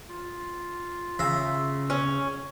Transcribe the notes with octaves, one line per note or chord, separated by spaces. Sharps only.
F4
C#3 E5 F5 A#5
C#4